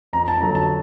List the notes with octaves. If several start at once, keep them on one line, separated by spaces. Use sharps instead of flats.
F2 A#5
A5
D3 F#3 A#5
A5